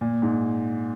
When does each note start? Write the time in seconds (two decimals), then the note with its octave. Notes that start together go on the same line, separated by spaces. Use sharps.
0.01 A#2
0.22 G#2